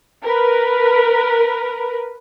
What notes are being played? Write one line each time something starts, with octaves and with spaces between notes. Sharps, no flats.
A#4 B4